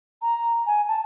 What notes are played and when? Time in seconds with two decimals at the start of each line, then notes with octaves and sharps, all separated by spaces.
0.22 A#5
0.66 G#5
0.88 A5